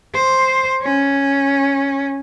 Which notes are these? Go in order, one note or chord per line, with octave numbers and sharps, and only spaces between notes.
C5
C#4